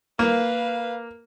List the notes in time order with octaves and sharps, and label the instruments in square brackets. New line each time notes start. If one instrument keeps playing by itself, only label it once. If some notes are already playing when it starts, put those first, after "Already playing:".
[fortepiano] A#3 [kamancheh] B4 F5